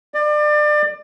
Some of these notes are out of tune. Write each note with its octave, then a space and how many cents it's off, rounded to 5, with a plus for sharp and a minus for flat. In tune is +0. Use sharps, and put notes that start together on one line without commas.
D5 +30